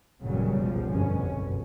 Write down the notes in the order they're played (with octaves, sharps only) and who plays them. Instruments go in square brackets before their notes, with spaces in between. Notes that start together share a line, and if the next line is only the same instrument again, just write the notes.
[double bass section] G1 F#2 A#2 C#3 F#3 G3
C#2 B2 F3
F1 C2 G2 B2 D3 C#4
F#1